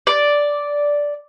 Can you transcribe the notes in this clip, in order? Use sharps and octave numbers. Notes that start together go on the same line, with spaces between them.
D5